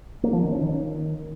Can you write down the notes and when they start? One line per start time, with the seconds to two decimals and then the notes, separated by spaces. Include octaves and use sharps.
0.23 A#3
0.33 F3
0.42 D#3
0.52 C#4
0.61 D#3